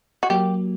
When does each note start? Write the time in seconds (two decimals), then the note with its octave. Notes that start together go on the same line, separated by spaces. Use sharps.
0.23 F#4
0.30 F#3 A#3 G4